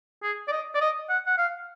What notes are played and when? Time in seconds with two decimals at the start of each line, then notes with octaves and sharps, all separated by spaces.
0.23 G#4
0.48 D5
0.52 D#5
0.75 D5
0.81 D#5
1.09 F#5
1.26 F#5
1.38 F5